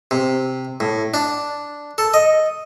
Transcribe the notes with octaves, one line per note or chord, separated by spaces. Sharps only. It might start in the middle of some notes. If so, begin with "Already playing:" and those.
C3
A2
D4
A4
D#5